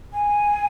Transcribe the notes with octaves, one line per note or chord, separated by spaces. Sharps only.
G#5